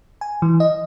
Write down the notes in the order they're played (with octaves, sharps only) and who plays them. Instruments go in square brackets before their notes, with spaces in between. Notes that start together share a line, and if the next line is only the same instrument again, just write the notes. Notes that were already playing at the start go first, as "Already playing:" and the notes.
[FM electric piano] G#5
E3
D#5